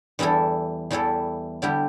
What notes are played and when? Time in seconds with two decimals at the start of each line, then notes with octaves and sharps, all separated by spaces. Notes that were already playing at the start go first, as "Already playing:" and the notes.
0.19 E2 E3 G3 E4 A4
0.91 E2 E3 G3 E4 A4
1.62 D3 G3 E4 G4